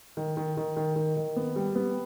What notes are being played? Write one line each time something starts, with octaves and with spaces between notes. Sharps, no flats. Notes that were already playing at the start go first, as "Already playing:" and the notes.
D#3
D#3
D#3
D#3
D#3
D#3
B3
G3
B3